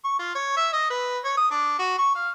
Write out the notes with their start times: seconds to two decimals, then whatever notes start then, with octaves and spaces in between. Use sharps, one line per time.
0.04 C#6
0.19 F4
0.35 C#5
0.57 E5
0.73 D#5
0.90 B4
1.24 C#5
1.37 D#6
1.51 D4
1.79 F#4
1.98 C#6
2.15 F5